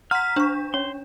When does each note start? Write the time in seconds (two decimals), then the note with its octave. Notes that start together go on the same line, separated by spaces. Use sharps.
0.11 F#5 A#5 C6 F6 B6
0.36 D4 C5 C#6
0.74 C#4 C#5 C6